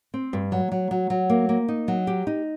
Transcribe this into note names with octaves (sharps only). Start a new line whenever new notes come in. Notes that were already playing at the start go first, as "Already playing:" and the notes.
C4
G2
F#3
F#3
F#3
F#3
A#3
A#3
D#4
F#3
G4
D#4